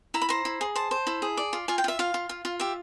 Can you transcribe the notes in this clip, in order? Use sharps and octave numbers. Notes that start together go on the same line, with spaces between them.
E4 A#5
B5
C5 A#5
E4
G#4
C5 A5
C5
E4
G#4
D5
F4
F4 G#5
G5
F4 E5
F4 F5
F4
F4
F4
G4 E5